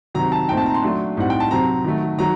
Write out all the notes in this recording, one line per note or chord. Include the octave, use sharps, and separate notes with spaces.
C3 D#3 F#3 A#5
A5
A#2 A3 C4 D#4 G5
A5
A#5
C6
F#3 A3 D4
A2 G3 C4 D#4 F#5
G5
A5
C3 F#3 C4 A#5
D#3 F#3 A3
D#3 F#3 A#5